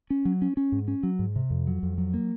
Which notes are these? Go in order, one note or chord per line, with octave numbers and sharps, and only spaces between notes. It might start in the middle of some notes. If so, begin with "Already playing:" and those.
C#4
F#3
C#4
C#4
G#2
C#4
F#3
G#2
C3
F2
F#3
F2
F#3
A#3